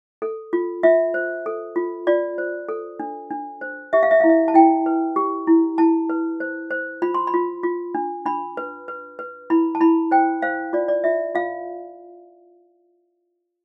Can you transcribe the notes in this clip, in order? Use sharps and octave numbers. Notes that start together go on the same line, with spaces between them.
A4
F4
F4 E5
C5
A4
F4
F4 D5
C5
A4
D4
D4
C5
G4 E5
F5
E5
E4 F5
E5
A5
E4 G5
B4
G4
E4
E4 A5
B4
C5
C5
F4 B5
C6
B5
F4
F4
D4
D4 B5
B4
B4
B4
E4 B5
A5
E4 B5
C5 G5
C5 F5
F4 D5
D5
F4 E5
F4 F5